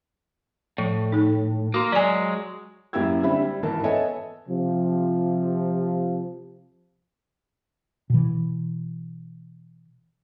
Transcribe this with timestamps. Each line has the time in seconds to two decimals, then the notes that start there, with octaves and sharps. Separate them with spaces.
0.78 A2 F3
1.12 D#4 A4
1.74 A#3 F#4 C6
1.92 F#3 G#3 D5 G#5
2.93 F#2 A#3 E4 G4 E6 G#6
3.23 D3 G3 C4 E5 B5
3.42 G3
3.63 G#1 E3 A#4 A5
3.84 B3 A4 C#5 D#5 E5 G#5
4.49 C3 F3
8.10 B2 E3